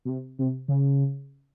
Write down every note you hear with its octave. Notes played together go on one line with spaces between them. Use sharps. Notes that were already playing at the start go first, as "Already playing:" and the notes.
B2
C3
C3
C#3